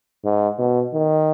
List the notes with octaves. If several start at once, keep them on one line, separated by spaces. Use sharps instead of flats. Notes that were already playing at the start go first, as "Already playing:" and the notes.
G#2
B2
D#3